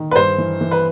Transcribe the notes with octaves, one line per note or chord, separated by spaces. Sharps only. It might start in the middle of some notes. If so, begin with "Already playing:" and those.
Already playing: D#3
B4
G2 C5
E3
E3
B4